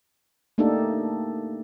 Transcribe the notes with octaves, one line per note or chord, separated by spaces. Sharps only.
A3 A#3 D4 D#4 G4 A4